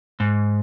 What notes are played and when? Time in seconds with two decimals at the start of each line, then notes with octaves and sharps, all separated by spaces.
0.20 G#2